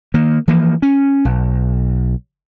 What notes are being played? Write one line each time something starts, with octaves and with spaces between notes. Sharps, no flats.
D#3 A#3
E3 F3 A#3
C#4
B1